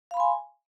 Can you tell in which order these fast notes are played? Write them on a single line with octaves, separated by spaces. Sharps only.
F5 B5 C6 G#5